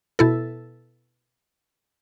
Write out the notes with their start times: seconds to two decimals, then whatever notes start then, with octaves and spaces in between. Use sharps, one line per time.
0.19 B2 E4 A4